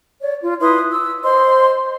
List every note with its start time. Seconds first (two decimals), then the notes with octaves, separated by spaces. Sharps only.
0.20 C#5 D5
0.40 F4
0.60 E4 B4 C6 D#6
0.89 E6
1.23 C5 D#5 C6